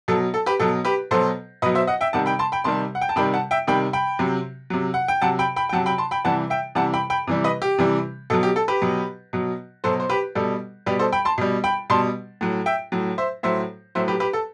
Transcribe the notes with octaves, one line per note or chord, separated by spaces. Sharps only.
B2 F#3 A4
A4
G4 B4
B2 F#3 A4
G4 B4
B2 F#3 A4 C5
B2 F#3 B4 D#5
C5 E5
D#5 F#5
E5 G5
C3 D#3 G3 F#5 A5
G5 B5
A5 C6
G5 B5
C3 D#3 G3 A5 C6
F#5
G5
A5
C3 D#3 G3 G5 B5
F#5 A5
E5 G5
C3 D#3 G3 G5 B5
G5 B5
C3 F#3
C3 F#3
F#5
G5
C3 F#3 F#5 A5
G5 B5
G5 B5
G5
C3 F#3 F#5 A5
G5 B5
A5 C6
G5 B5
C3 E3 G3 F#5 A5
E5 G5
C3 E3 G3 F#5 A5
G5 B5
G5 B5
C3 E3 G3
B4 D#5
G4
C3 E3 G3
B2 F#3 A4
G4
A4
G4 B4
B2 F#3
B2 F#3
B2 F#3 A4 C5
C5
G4 B4
B2 G3 A4
B2 G3 G4 B4
A4 C5
G5 B5
A5 C6
B2 G3
G5 B5
B2 G3 A5 C6
A2 F#3
E5 G5
A2 F#3
C5 E5
A2 F#3 C5 E5
A2 F#3 C5 E5
G4 B4
G4 B4
A4